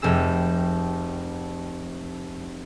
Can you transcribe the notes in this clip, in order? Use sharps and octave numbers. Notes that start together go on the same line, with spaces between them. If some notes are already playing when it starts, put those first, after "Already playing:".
F1 G4 G#4 E6